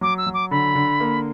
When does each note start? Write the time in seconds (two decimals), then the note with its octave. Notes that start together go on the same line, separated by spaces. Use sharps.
0.01 F#3 D6
0.18 E6
0.27 F#3
0.34 D6
0.51 D3 B5
0.75 D3
1.00 A#3